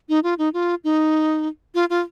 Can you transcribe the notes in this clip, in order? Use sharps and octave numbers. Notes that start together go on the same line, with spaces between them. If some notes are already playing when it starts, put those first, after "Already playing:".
D#4
F4
D#4
F4
D#4
F4
F4